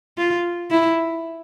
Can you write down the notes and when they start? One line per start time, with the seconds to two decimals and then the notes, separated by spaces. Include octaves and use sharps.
0.18 F4
0.71 E4